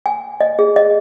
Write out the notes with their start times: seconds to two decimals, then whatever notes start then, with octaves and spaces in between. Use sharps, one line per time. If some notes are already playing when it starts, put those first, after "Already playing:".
0.06 G#5
0.41 D#5
0.59 G#4
0.76 D#5